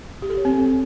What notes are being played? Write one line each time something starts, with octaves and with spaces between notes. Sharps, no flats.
G4
A4
C#5
C4